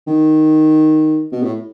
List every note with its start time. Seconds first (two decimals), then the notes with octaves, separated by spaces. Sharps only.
0.07 D#3
1.32 B2
1.43 A2